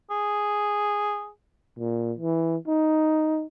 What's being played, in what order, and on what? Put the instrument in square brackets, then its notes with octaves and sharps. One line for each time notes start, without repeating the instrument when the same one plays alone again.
[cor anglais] G#4
[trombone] A#2
E3
D#4